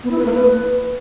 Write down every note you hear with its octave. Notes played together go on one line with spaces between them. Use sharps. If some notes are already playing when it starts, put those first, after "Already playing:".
B3
E4
B4
A#3
B4